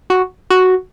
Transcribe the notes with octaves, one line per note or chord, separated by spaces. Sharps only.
F#4
F#4